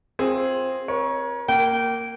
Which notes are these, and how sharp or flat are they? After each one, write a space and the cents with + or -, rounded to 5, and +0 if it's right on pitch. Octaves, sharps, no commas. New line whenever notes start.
C4 +10 F4 +0 G#4 +0
A#4 +40 C#5 +0
A#3 -10 G5 -25